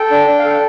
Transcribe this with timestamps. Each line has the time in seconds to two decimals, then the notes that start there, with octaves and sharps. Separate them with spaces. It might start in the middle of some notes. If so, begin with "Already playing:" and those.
Already playing: A4 G5
0.11 D4
0.28 D4
0.39 F5
0.44 A4
0.50 G5